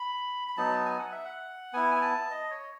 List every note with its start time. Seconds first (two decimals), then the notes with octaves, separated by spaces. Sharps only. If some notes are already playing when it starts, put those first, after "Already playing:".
Already playing: B5
0.48 B5
0.57 F#3 B3 D#4 A5
0.85 G#5
0.99 F#5
1.12 E5
1.25 F#5
1.73 B3 E4 G#5
1.95 G#5
2.01 A5
2.30 D#5
2.51 C#5